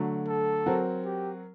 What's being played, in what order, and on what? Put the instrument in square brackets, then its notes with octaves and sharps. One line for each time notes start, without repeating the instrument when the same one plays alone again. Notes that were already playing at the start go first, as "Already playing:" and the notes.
Already playing: [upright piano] D3 F#3 A3
[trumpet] A4
[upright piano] F#3 C4 F#4 A#4
[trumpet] G4